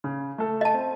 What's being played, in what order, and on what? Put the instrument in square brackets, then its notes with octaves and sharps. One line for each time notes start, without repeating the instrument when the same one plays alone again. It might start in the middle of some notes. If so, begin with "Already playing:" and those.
[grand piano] C#3
A3 A4
[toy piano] D#5 A5
[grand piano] C4